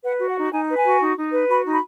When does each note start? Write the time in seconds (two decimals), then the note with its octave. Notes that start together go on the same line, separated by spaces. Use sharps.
0.04 B4 F#5
0.20 F#4
0.28 F#5
0.37 D#4
0.52 D#4 G#5
0.69 B4
0.76 G#5
0.85 F#4
1.00 D#4
1.16 D#4
1.32 B4
1.49 F#4 B5
1.65 D#4
1.73 B5